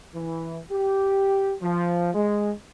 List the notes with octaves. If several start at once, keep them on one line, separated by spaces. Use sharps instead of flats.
E3
G4
F3
G#3